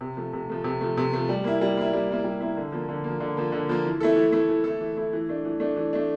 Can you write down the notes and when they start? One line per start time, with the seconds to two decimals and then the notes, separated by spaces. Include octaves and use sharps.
0.01 C3
0.17 F3 A3
0.33 C3
0.49 F3 A3
0.64 C3
0.81 F3 A3
0.97 C3
1.13 F3 A3
1.29 G3
1.44 A#3 E4
1.61 G3
1.77 A#3 E4
1.93 G3
2.09 A#3 E4
2.24 G3
2.41 A#3 E4
2.57 D3
2.72 F3 A#3
2.88 D3
3.04 A#3
3.10 F3
3.20 D3
3.37 F3 A#3
3.52 D3
3.69 F3 A#3
3.85 E3
4.00 A3 E4 A4
4.16 E3
4.32 A3 E4 A4
4.49 E3
4.64 A3 E4 A4
4.81 E3
4.97 A3 E4 A4
5.13 E3
5.29 A3 D4
5.45 E3
5.60 A3 D4
5.77 E3
5.93 A3 D4